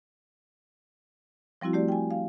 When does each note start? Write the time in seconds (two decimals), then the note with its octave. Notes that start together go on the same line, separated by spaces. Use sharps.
1.61 F3 G3 C4 E4 F#4
1.73 A3 G4 D5
1.88 G5 G#5
2.11 F5